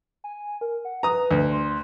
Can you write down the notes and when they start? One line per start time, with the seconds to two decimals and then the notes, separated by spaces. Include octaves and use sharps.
0.24 G#5
0.61 A#4
0.85 F#5
1.03 B4 A#5 D#6
1.31 D2
1.52 C6